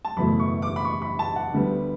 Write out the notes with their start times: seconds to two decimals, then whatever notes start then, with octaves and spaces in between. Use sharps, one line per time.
0.05 A5
0.17 F#1 E2 B2 A3 B5
0.40 C#6
0.62 D6
0.76 B5
0.85 C#6
1.02 B5
1.19 A5
1.36 F#5
1.53 D2 D3 G3 B3